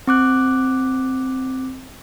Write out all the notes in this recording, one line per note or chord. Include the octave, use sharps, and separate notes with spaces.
C4 D6 F#6